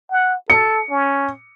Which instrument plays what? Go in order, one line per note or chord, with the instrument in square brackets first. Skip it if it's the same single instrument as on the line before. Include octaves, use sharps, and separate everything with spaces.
[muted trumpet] F#5
[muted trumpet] A4 [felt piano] C#7
[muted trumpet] C#4